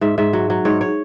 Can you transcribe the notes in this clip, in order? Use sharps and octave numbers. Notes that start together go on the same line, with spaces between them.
G#2 E5
G#2 E5
F#3
F#3
G#2 C#5
C#5